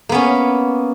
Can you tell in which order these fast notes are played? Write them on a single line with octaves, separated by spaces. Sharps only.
A#3 B3 C#4